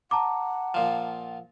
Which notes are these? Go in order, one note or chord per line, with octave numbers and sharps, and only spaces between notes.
F#5 A5 A#5 D6
A#2 F3